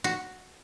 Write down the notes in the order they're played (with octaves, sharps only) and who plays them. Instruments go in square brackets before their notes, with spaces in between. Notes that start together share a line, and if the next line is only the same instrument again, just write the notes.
[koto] F#4